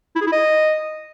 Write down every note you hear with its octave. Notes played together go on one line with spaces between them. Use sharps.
E4
G#4
E4
D#5